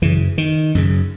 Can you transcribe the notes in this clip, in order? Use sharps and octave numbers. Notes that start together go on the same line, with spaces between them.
F#2 C#3 E3
D#3
F#2 C#3